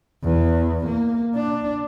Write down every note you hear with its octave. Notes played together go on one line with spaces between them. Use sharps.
E2
A#3
D4